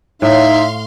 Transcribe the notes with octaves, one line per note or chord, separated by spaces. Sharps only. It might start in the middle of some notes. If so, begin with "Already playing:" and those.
A2 D#4 E5 F5 C6